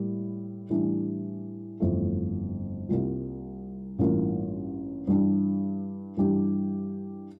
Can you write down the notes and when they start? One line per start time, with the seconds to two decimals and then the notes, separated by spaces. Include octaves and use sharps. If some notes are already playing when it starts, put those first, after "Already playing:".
Already playing: A2 G3 A#3 E4
0.70 A2 E3 G3 D4
1.80 G1 F2 E3 A3
2.89 C2 C3 G3 A#3 F4
3.99 A1 G2 E3 A#3 F4
5.07 G2 E3 G3 D4 G4
6.17 G2 E3 G3 D4 G4